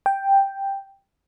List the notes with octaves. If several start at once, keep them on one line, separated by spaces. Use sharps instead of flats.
G5